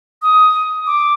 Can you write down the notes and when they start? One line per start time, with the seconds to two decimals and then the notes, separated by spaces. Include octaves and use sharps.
0.22 D#6
0.87 D6